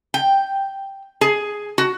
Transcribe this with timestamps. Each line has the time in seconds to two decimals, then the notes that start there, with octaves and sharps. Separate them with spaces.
0.14 G5
1.21 G#4
1.78 F#4